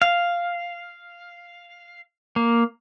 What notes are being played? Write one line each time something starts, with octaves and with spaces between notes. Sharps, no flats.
F5
A#3